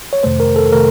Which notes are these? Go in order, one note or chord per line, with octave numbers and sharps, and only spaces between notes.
C#5
F2 C3 D#3 A3 C5
A#4
A4
C3 D#3 A3 A#4